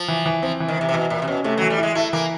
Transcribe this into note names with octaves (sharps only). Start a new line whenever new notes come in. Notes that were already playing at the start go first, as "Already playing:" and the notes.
Already playing: F3
E3
E3
F3 C4
E3
D#3
C3 E3
C3
B2 E3
A#2 E4
C3
B2 C#4
C3 A3
F#3
E3
G3
G#3 E4
A3 E4
E3 A#3